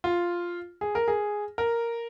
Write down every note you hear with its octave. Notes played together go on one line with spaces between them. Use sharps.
F4
G#4
A#4
G#4
A#4